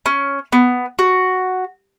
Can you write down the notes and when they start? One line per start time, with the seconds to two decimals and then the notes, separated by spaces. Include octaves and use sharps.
0.06 C#4
0.52 B3
0.99 F#4